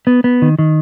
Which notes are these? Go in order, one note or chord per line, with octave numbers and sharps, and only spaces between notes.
B3
B3
D#3
D#3